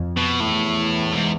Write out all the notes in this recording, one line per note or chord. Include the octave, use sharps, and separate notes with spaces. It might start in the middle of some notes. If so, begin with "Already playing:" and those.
Already playing: F2
B2
E2 A2
G#2